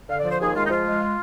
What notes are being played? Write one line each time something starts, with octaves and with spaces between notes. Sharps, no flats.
D3 F5
D5
F3
C5
D#2 G#4
G#3 F4
D#4
F3 F4
G#3